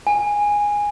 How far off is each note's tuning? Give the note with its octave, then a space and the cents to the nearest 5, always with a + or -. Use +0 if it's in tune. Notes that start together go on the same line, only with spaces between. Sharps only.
G#5 -10